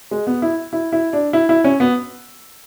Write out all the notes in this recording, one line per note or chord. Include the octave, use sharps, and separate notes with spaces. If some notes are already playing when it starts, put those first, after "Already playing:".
G#3
B3
E4
E4
E4
D4
E4
E4
C#4
B3